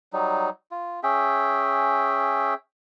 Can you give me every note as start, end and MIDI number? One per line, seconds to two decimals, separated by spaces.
0.13 0.50 54
0.13 0.50 55
0.13 0.50 63
0.71 1.00 65
1.03 2.54 61
1.03 2.54 68
1.03 2.54 76
1.03 2.54 79